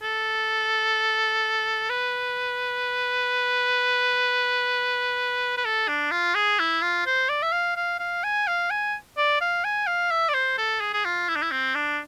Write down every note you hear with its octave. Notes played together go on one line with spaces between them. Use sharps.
A4
B4
B4
A4
D4
F4
G#4
E4
F4
C5
D5
E5
F5
F5
F5
G#5
F5
G#5
D5
F5
G#5
F5
E5
D5
C5
A4
G#4
G#4
F4
E4
D4
E4
C4
D4